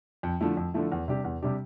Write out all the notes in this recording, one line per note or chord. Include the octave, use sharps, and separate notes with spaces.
F2
D3 F3 A3 E4
F2
D3 F3 A3 E4
E2
C3 G3 D4 G4
E2
C3 G3 D4 G4